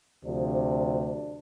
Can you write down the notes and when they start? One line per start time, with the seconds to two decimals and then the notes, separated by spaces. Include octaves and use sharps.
0.24 D2 C3 F3 D4